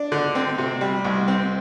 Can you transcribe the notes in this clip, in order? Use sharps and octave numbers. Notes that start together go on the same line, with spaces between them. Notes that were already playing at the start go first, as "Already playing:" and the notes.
Already playing: D4
D3
C4
C3
G3
C2
C4